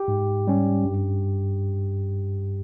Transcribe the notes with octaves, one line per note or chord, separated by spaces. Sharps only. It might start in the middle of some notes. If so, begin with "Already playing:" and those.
Already playing: G4
G#2
G3 C#4
G2